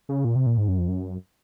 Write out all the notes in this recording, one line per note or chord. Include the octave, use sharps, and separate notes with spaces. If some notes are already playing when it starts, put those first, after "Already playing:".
C#3
A#2
C3
A#2
G#2
F#2
F2
F#2